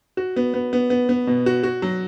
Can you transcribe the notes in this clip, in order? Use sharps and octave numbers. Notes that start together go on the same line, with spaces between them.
F#4
B3
B3
B3
B3
B3
B2
F#4
F#4
F#3